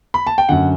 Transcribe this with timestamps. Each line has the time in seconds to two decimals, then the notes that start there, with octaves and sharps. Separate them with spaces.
0.14 B5
0.27 A5
0.38 G5
0.49 F#2 D3 F#5